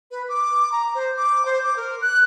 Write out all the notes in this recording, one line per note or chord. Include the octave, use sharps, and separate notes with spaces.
B4
D6
A#5
C5
D6
C5
D6
A#4
F#6